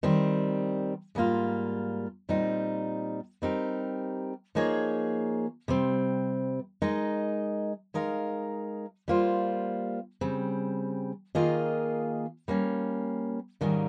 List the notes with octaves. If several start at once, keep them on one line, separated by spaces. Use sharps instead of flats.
D#3 G3 C4
G#2 G3 A#3 F4
A#2 G3 C4 D#4
G3 C4 D#4 G4 A#4
F3 A#3 D#4 G#4 C#5
C3 G3 C4
G#3 D#4 A#4 D#5
G#3 D#4 A#4 F5
G3 A#3 F4 C5
C#3 G3 C4
D#3 A#3 F4 G#4 D#5
G3 A#3 C#4
G#2 D#3 G3 A#3 C#4